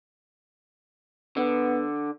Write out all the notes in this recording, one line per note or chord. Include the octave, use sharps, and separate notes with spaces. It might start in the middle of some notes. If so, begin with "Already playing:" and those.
D3 B3